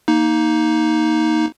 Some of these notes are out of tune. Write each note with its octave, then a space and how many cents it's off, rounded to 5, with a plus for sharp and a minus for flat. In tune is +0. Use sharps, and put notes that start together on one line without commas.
A#3 +0 D#4 +10